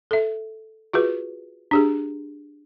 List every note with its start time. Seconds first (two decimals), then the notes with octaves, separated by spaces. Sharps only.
0.11 A4 E5
0.93 F4 F#4 G#4 B4
1.71 D4 G4 G#4